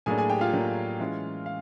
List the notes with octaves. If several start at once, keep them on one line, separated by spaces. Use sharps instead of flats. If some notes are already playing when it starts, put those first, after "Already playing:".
A2 F#3 A#3 D4 G#4 G#5
G#4 G#5
G4 G5
F4 F5
A2 F#3 A#3 D4
E3 G#3 C#4
F5